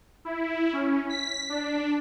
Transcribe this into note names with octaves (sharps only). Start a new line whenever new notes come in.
E4
C#4
B6
D4